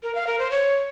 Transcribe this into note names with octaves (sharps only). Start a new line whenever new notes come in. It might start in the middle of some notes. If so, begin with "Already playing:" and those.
A#4
F5
A#4
C5
C#5